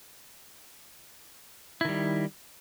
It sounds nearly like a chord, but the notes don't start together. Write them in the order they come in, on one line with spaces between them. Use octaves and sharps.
E4 D#3 G3